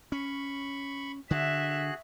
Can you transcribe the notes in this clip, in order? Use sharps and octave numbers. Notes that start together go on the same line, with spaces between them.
C#4 B5 C#6
D3 F#4 G#4 E5 F#6